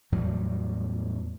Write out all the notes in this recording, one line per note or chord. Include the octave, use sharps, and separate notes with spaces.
E2 A2 F#3 G3